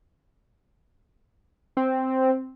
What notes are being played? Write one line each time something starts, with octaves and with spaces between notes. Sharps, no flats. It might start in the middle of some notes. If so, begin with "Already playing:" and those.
C4